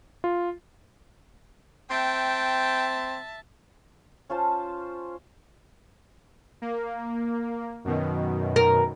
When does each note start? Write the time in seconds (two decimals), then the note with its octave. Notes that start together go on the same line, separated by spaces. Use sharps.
0.24 F4
1.90 C4 E5 G5 A5
4.29 C#4 F4 C5 A5
6.62 A#3
7.85 F#2 B2 D#3
8.56 A#4